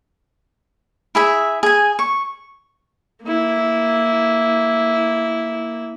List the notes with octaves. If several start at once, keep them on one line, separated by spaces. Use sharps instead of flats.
E4 G#4 E5
G#4 G#5
C#6
A#3 E4